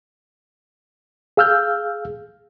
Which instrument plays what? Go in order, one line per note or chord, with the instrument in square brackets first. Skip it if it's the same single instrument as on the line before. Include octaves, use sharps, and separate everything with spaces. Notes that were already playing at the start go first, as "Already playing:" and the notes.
[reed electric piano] G#4 F5 E6 F6 G6